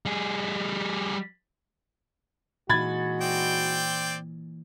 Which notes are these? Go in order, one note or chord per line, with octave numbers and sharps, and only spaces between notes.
G3 G#4
A#2 E3 G#3 D#4 F#4 B5 G#6 A6
C4 D5 G5